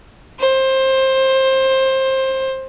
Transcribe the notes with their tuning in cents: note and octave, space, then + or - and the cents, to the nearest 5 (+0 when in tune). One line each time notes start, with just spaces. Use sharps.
C5 +20